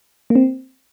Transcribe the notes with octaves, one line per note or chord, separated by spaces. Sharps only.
A#3
C4